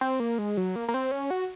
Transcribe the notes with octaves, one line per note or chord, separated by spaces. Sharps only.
C4
A#3
G#3
F#3
A#3
A#3
C4
C#4
F#4